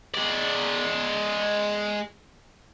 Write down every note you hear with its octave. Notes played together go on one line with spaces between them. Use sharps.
G#3 D5